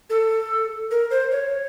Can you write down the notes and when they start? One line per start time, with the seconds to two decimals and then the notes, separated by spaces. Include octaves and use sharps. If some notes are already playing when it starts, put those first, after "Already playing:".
0.10 A4
0.91 A#4
1.11 C5
1.32 C#5